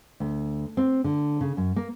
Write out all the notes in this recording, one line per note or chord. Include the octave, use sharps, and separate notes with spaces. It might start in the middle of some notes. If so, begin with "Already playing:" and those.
D2
C4
D3
C#3
F#2
A#3